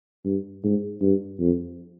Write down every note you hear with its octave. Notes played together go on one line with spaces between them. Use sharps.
G2
G#2
G2
F2